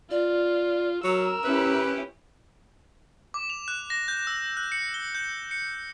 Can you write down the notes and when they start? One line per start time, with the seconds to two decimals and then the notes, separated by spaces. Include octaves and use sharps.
0.11 F4 D5
1.04 F#3 A#4 A#5 E6
1.44 C#4 E4 G4 B4
3.34 D6
3.50 F7
3.68 F#6
3.90 A#6
4.08 G6
4.27 E6
4.57 F#6
4.72 C#7
4.94 G7
5.15 G6
5.51 C#7